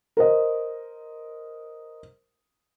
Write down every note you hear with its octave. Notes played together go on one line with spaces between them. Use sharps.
A#4 C5 D#5